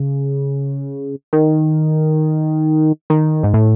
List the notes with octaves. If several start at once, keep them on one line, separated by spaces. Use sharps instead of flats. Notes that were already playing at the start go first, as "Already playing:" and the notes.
Already playing: C#3
D#3
D#3
G#2
A2